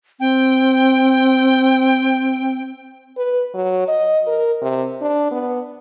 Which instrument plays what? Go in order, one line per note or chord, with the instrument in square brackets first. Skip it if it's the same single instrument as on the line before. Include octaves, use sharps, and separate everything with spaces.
[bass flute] C4 [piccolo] G5
[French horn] B4
F#3
D#5
A#4
C3
D4
B3